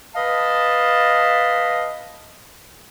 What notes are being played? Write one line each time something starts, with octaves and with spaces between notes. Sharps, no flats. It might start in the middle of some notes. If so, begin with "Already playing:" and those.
B4 D#5 F5 A5